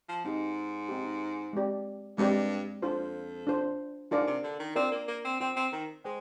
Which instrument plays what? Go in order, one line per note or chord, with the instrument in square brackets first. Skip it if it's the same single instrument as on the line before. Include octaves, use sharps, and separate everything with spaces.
[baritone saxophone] F3
[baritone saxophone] G#2 [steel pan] C4 D#4 G4
[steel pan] C4 D#4 G4
G#3 C4 G4 D5
[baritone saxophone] G2 [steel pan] G#3 C4 G4 D5
[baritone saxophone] F2 [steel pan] D4 F4 C5
[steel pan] D4 F4 C5
[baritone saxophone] G#2 [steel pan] D4 F4 A#4 D5 F5
[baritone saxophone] C3
D3
D#3
[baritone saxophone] C4 [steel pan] D4 F4 A#4 D5 F5
[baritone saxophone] A#3
A#3
C4
[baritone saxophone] C4 [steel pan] F4 C5 G5
[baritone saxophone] C4
D#3
[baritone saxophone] G#3 [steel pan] C5 G5